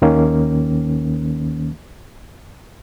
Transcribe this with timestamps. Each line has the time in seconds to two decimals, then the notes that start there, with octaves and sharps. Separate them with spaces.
0.02 D#2 D#3 A#3 C#4